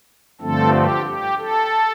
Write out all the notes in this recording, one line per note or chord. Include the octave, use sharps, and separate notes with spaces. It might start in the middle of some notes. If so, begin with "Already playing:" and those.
G2 D3 F3 A3 C4 A4
G4
G4
A4